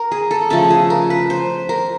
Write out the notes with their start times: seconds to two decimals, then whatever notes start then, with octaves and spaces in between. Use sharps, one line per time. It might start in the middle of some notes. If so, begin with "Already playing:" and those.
Already playing: A#4
0.12 G#4
0.31 A4
0.50 C#3 F3 A3 A4
0.70 G#4
0.90 A#4
1.10 B4
1.30 C5
1.69 A#4